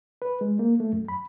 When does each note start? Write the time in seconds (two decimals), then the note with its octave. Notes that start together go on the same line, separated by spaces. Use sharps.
0.22 B4
0.41 G#3
0.59 A#3
0.80 A3
0.93 F#2
1.08 B5